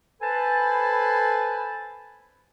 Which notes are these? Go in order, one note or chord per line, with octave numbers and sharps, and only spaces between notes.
A4 B4 C5 G#5 A5 B5